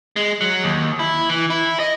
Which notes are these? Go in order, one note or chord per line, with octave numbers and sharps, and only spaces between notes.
G#3
F#3
D#2
E4
E3
E4
D#5